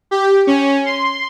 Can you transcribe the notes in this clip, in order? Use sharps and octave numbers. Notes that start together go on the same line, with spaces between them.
G4
C#4
C6